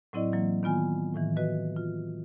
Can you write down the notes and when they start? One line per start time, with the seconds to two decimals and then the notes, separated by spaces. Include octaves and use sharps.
0.13 A2 F#3 C4 E4 D5 D#5
0.32 E3 F#3 A#3
0.63 D#3 B3 F4 G#5
1.15 A2 D#3 E3
1.36 F#4 B4 D#5
1.77 F4